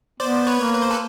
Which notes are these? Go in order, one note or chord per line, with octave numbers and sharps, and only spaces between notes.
B3 C5 D5
B4 C#5
A#3
B4
C5
A4 B4